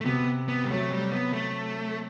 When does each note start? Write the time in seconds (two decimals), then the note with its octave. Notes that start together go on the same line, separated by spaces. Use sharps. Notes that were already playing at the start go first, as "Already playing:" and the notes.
0.01 A3
0.05 C3 B3
0.48 B3
0.64 G3
0.70 F#3 A3
0.91 G3
1.12 B3
1.33 A3